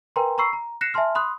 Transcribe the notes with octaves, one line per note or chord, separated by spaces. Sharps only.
A#4 B4 G5 G#5 A#5 C6
A#5 B5 C#6 E6 C7
A#5
F#6 A#6 C7 C#7 E7
E5 G#5 A5 C6 F6
B5 C6 D#6 F#6